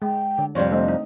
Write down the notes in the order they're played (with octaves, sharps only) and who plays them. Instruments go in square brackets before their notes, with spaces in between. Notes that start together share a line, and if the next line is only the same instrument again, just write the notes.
[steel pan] G#3 [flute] G5
[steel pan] D3
[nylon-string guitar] F2 C3 G3 [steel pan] C#5 [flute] D5
[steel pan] A3 C4 D4 [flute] D#5
[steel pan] D#4